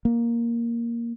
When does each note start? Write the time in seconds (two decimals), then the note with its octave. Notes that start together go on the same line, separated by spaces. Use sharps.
0.05 A#3